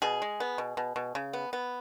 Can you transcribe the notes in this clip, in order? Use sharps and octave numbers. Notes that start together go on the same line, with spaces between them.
B2 G#4
G#3
B3
B2
B2
B2
C#3
B3
B3